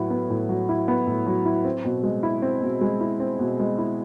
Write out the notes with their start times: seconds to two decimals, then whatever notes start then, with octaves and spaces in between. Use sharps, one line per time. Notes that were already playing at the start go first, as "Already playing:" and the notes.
Already playing: A2 F#3 B3 E4
0.10 B3
0.30 A2
0.49 F#3
0.69 E4
0.88 B3
1.07 A2
1.27 F#3
1.46 E4
1.65 C4
1.85 B2
2.03 G#3
2.23 E4
2.42 C4
2.62 B2
2.81 G#3
3.01 E4
3.20 C4
3.39 B2
3.59 G#3
3.78 E4